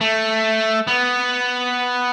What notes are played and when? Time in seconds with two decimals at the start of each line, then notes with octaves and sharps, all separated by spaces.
0.01 A3
0.87 B3